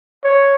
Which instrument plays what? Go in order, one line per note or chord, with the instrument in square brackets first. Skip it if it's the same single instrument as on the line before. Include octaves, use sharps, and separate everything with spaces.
[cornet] C#5